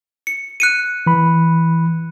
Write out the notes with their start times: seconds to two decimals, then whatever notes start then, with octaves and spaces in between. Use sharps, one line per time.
0.27 C#7
0.60 F#6 C#7 D#7
1.07 E3 B5